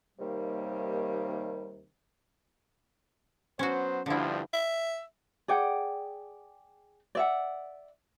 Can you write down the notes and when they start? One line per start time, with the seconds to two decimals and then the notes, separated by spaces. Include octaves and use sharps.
0.19 D#2 C3 D#3 G3 A#3
3.59 F#3 B3 C#4 F#4 C5
4.06 D2 G2 D3 F3 E4
4.54 E5
5.48 G#4 D5 F#5 G5
7.15 D5 E5 F#5